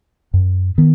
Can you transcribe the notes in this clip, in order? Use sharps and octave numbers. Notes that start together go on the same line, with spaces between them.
F#2
D#3 B3